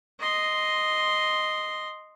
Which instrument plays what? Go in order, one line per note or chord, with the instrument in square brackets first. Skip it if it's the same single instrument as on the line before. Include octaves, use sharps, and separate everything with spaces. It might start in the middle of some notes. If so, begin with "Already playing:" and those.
[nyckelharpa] D#5 C6